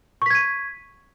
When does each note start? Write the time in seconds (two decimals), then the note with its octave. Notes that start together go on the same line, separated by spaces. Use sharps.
0.22 C#6
0.26 B6
0.30 G#6
0.35 D#7